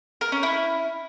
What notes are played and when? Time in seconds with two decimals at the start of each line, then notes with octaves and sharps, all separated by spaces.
0.21 A#4
0.32 C#4
0.43 E4